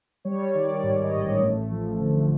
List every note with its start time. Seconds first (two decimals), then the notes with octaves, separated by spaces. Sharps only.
0.25 G3 C#5
0.54 D#3 D5
0.83 G#2
1.03 D#5
1.13 A1
1.42 A3
1.70 F3
2.00 D3